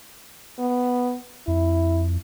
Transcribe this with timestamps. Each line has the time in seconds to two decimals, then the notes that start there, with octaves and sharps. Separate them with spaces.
0.59 B3
1.48 F2 E4